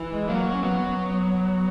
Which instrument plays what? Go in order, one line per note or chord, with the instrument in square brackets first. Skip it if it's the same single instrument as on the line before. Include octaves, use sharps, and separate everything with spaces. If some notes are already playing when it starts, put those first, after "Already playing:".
Already playing: [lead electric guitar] E3
[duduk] G#3
[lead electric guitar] F#3 [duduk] A#3
[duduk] C#4
[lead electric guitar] F#3 [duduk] B3
[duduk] B3